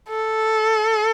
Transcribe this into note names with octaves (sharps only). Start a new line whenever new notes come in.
A4